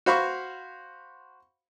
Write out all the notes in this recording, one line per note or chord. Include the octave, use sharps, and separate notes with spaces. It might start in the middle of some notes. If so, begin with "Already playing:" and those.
F#4 C5 F5 B5 C#6